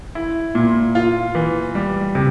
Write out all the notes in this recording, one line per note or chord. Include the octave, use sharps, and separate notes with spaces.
E4
A#2
F4
E3
G3
C3